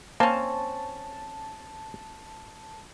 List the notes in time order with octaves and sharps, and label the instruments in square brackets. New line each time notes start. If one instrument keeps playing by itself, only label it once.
[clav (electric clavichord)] A#3 [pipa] C4 C#4 [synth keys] A5